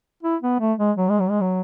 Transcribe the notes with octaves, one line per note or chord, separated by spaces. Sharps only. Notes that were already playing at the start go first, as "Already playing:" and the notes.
E4
B3
A3
G#3
F#3
G#3
F#3
G#3
F#3